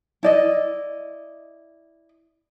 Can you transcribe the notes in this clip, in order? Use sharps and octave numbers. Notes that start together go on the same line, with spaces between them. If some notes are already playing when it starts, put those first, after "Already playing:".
E4 D5 D#5